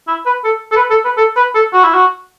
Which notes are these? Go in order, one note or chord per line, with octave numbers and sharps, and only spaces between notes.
E4
B4
A4
A4
B4
A4
B4
A4
B4
A4
F#4
E4
F#4